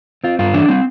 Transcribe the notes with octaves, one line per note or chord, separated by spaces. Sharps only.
C4 F4
G2 F4
E3 D4
G3 C4